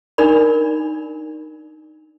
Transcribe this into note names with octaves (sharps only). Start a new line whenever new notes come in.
D4 D#4 A#4 D5 B5